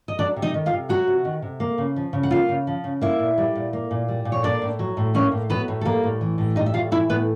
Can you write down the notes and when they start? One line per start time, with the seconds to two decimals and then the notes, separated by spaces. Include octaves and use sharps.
0.08 D#5
0.18 F#3 D4 D5
0.36 C3
0.42 D#4 D#5
0.54 D#3
0.66 F4 F5
0.72 C3
0.89 F#3 F#4 F#5
1.07 C3
1.25 D#3
1.42 C3
1.60 A#3
1.78 C#3
1.96 F3
2.13 C#3
2.23 F#5
2.31 A#3 F4 F5
2.49 C#3
2.67 F3
2.84 C#3
3.01 A#3 E4 E5
3.19 A#2
3.38 G3
3.55 A#2
3.73 A#3
3.91 A#2
4.08 G3
4.25 A#2
4.32 C#5
4.43 A#3 D4 D5
4.62 A2
4.79 F#3
4.97 A2
5.14 A#3 C#4 C#5
5.32 A2
5.49 F#3 B3 B4
5.68 A2
5.81 A4
5.85 G3 A#3 A#4
6.03 A2
6.21 E3
6.38 A2
6.55 G3 D#4 D#5
6.66 E5
6.73 A2 F4 F5
6.91 E3 E4 E5
7.09 A2 B3 B4